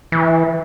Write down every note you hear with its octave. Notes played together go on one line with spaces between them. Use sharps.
E3